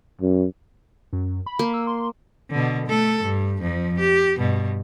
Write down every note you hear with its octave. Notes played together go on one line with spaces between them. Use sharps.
F#2
F#2
B5
A#3
E6
C6
B2 D3
A3 A4
G2
F2 F3
G4
G2 B2